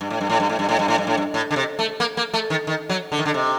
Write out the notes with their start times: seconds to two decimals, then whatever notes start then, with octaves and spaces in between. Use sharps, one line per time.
0.01 G2
0.10 A2
0.21 G2
0.30 A2
0.40 G2
0.49 A2
0.59 G2
0.69 A2
0.79 G2
0.88 A2
0.98 G2
1.07 A2
1.17 G2
1.34 A2
1.51 D3
1.56 C3
1.79 A3
2.00 A#3
2.17 A#3
2.34 A3
2.50 D#3
2.67 D#3
2.90 F#3
3.12 D3
3.19 D#3
3.26 D3
3.34 C3